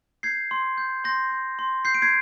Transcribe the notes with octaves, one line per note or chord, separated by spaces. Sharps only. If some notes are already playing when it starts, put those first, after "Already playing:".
G6 G#6 C7
C6
G6
C6 G6 A#6
G6
C6
G6 C7
D7
G#6 C7